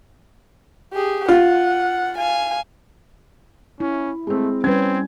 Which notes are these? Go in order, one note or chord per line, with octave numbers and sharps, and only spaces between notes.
G4 G#4
F4 F#5
F5 G#5
C#4 E4
G#3 A3 C4
G3 C4 C#4 B4 G#6